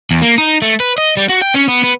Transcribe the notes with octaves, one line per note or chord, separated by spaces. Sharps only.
E2
A#3
D#4
A3
B4
D#5
G3
F#4
G5
C#4
B3
B3